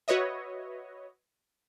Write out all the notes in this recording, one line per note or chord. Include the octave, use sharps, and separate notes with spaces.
F#4 B4 C#5 D#5 E5